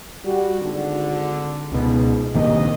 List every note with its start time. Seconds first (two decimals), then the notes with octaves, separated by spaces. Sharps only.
0.24 G3 F#4
0.60 G#1 D3
1.72 C#2 G#2 B2
2.34 A#1 C3 D#3 A#3 D#5